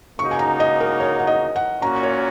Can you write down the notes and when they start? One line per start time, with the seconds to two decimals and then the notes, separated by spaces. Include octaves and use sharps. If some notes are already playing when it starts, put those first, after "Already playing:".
0.19 C#2 C#3 A#3 D#4 F#4 C#6
0.31 G#5
0.39 A#5
0.60 D#5
0.80 A#4
1.00 C#5
1.19 F#5
1.27 D#5
1.56 F#5
1.82 A#2 A#3 C#4 F#4 A#5
2.03 C#5